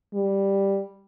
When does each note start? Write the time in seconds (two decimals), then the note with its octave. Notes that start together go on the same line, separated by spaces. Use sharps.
0.14 G3